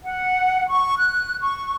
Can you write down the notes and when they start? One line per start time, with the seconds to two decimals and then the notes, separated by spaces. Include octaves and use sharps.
0.03 F#5
0.69 C#6
0.97 F#6
1.41 C#6